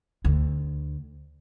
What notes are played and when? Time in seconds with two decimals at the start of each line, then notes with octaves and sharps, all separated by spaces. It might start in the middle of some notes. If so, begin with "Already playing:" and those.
0.24 D2